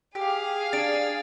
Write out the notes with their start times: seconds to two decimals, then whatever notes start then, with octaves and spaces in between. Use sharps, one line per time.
0.15 G4 G#4 F5
0.73 D4 A6 D7